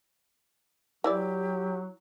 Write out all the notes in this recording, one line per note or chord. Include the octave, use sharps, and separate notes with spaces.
E3 F#3 E4 G4 D5